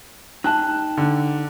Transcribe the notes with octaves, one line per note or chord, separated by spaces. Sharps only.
D#4 G5 A5 F#6
D3